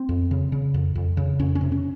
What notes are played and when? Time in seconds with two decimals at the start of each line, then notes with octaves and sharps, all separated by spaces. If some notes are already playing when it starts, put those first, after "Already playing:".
Already playing: C4
0.09 F2
0.31 C#3
0.52 C#3
0.74 F2
0.95 F2
1.17 C#3
1.39 F2 C#4
1.55 C#4
1.61 C3
1.72 C#4